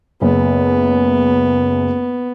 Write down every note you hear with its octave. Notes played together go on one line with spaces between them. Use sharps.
F#1 B3